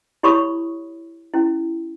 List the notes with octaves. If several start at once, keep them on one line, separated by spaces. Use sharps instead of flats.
E4 G4 C#5 B5 C#6 D#6
C#4 E4